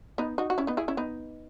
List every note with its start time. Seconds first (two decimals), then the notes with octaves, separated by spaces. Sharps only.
0.18 B3 D#4
0.38 D#4 F#4
0.50 F#4
0.58 C#4 E4
0.67 B3 D#4
0.77 E4 G#4
0.88 C#4 E4
0.97 B3 D#4